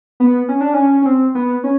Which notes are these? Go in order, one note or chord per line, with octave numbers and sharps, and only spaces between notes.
B3
C#4
D4
C#4
C#4
C4
B3
C#4